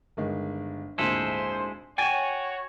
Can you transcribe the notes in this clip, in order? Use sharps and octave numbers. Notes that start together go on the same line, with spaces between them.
G1 D#3 G#3
G#1 D2 A#2 G#3 E4 A4 C5
F#4 C#5 G5 G#5 A6 E7